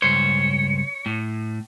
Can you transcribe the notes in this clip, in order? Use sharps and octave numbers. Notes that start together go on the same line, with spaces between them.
C#2 G2 C5 C#5
A2